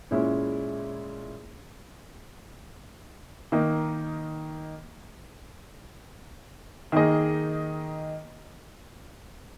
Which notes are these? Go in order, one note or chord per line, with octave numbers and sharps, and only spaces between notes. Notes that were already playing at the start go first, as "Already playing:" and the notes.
A#2 G#3 C#4 E4
D#3 A#3 D#4
D#3 A#3 D#4 G#4 D#5